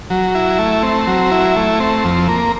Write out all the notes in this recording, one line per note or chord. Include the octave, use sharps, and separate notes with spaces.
F#3
E4
A3
C4
F#3
E4
A3
C4
F2
A#3